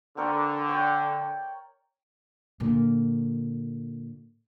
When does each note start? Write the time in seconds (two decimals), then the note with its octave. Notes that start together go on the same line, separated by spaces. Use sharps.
0.17 D3 C4 A#4 C#6
0.69 C#5 D5 G5
2.60 A#2 D3